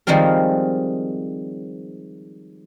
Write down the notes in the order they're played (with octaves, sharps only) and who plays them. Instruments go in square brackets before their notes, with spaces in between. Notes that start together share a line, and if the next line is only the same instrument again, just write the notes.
[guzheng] D#3 F3 G3 G#3 C4 A#4